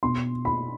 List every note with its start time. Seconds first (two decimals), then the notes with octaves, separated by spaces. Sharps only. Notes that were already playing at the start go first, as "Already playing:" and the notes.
0.03 B2 C6
0.45 B5